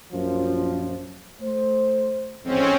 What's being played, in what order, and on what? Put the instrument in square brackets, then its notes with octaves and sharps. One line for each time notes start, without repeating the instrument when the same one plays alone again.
[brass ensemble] A#1 F#2 F3
A3 C5
[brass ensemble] A1 F2 G#2 [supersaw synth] C4 C#4